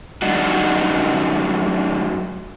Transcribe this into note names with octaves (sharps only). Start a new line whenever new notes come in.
F#2 G3 D4 D#4 F#4